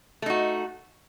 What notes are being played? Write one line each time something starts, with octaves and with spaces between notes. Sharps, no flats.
A3 D#4 F#4